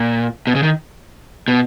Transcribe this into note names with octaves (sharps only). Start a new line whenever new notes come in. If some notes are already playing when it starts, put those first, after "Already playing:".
Already playing: A#2
B2
C#3
D#3
B2